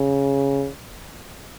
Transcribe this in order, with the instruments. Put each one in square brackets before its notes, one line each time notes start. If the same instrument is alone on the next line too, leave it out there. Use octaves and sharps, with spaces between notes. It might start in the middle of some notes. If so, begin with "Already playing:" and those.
Already playing: [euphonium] C#3